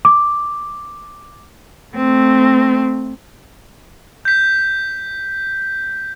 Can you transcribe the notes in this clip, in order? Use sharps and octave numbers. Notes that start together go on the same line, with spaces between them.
D6
A3 C4
G6 B6